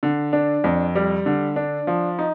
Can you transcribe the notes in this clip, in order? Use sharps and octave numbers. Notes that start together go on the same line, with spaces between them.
D3
D4
F2
G3
D3
D4
F3
D#4